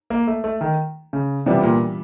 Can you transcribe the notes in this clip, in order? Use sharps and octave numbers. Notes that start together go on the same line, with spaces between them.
A#3
A3
A3
D#3
C#3
C3 E3 G3 B3 D4 F4
A#2